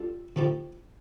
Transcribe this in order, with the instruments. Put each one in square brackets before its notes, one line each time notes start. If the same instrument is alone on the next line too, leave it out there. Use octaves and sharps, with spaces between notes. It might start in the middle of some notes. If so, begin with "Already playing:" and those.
Already playing: [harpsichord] G3 D4 F4 A4
[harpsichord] A2 F3 A3 D#4 G4 [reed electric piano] D3